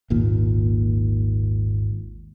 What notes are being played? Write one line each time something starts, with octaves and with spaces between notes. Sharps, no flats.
G#1 D#2 A#2